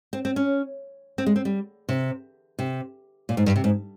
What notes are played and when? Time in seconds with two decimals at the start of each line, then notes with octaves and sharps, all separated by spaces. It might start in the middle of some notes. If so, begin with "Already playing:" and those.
0.13 C4
0.25 C4
0.36 C#4
1.18 C4
1.26 G#3
1.36 C4
1.45 G3
1.89 C3
2.59 C3
3.29 A#2
3.37 G#2
3.46 G2
3.56 C3
3.64 G#2